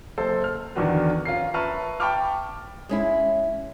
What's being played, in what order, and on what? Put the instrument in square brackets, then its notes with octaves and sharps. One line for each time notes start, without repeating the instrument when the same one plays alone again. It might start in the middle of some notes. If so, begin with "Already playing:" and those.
[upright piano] F#1 A4 C5 C6
F6
E2 D3 D#3 D4 F#4 B4
C#4 F4 A#4 C7
B4 E5 A5 A#5 C#6 F6
G5 A5 B5 C#6 D6 F6
[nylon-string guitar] G#3 C#4 E4